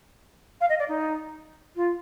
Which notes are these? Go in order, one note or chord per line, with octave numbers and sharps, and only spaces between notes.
F5
D#5
D5
D#4
F4